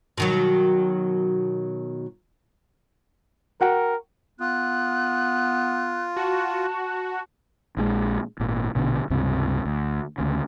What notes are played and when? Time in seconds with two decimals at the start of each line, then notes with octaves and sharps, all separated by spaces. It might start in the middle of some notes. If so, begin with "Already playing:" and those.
0.18 B2 D#3 F#3
3.61 F#4 A#4 F#5 G5
4.40 B3 F4 F#6
6.17 F#4 A5
7.77 A#1 C#3 G#3
8.39 G#1 A#2
8.75 A#1 B2 D3
9.10 C#2 G2 C3
9.65 D2
10.18 D2 C#3